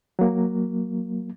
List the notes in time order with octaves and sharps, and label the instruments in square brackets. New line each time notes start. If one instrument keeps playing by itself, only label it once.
[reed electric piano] F#3 A#3